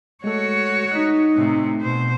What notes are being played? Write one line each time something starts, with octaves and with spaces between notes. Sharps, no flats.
G#3 A3 F#4 A4 C#5
D#4 F#6 B6
A2 C3
B2 C5